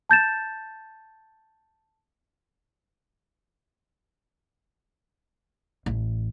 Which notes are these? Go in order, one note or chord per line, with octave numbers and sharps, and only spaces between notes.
A5 G6 A6 E7
A1